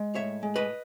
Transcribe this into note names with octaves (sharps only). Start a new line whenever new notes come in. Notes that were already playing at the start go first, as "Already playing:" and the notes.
Already playing: G#3
A2 C#5 E5
G#3
B4 D#5